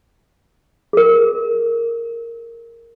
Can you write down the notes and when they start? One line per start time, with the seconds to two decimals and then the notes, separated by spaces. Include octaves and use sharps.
0.93 G#4 A#4